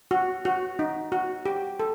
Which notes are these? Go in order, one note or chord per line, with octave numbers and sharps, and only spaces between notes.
F#4
F#4
D#4
F#4
G4
A4